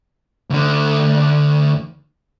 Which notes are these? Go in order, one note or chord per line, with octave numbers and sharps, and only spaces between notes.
D2 D3